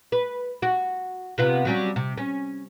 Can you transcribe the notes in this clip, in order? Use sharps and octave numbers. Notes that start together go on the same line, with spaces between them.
B4
F#4
C3 B3 F4
F#3 G3 C#4
C3
C#4